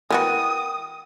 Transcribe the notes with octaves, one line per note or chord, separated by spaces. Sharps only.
E3 B3 F#4 A#4 G5 D#6